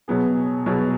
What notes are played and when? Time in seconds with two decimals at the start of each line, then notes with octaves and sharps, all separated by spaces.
0.08 B2 F#3 B3 G#4
0.66 B2 F#3 B3 G#4